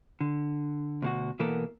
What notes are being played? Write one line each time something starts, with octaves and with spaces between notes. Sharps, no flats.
D3
D2 B2 F#4
B2 E3 A#3 B3 A4 A#4